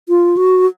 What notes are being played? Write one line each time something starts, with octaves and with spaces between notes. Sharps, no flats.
F4
F#4